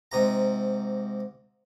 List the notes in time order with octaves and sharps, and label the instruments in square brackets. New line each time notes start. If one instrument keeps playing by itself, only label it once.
[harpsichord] G#2 C3 A#5